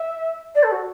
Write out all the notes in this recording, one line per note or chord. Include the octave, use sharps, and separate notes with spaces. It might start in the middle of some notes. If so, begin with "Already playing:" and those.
Already playing: E5
D5
A4
F#4